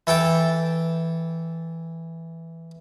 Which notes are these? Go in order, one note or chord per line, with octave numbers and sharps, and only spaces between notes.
E3 A4 G5 A5